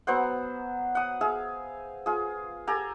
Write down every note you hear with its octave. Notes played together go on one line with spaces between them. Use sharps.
F#3 B3 C5 F#5
F#5 D#6
G#4 E5 F5
F4 G#4
G4 A4 G#5 A#5